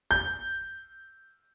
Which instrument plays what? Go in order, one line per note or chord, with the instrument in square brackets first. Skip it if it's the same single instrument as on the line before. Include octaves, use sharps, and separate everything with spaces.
[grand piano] G6